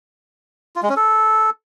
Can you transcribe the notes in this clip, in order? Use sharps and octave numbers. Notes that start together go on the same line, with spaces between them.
F4
G#3
C#4
A4